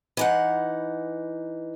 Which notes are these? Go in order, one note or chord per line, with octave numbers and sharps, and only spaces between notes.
E3 D#4 F#5